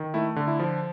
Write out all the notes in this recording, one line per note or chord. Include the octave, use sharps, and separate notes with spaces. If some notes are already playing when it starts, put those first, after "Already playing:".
Already playing: D#3
A3 E4
D3
E4
F3